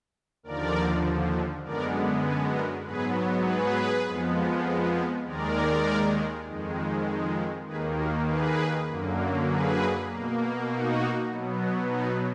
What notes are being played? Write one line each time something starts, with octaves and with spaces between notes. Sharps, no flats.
D#2 D3 F3 A#4 D5
F#2 D3 G#3 B3 A#4 D5
G#4 B4
F#4 A#4
G#2 F#3 B3 G#4 B4
G#4 B4
F2 F3 G#3 B3
D#2 D#3 G#3 A#4 D5
F2 D#3 G#3
D#2 D#3 A#3 G#4 B4
F#4 A#4
G#4 B4
F#2 D3 F#3 A#3
G#4 B4
B2 A#3
D#4 F#4
B2 F#3 B3
B3 D#4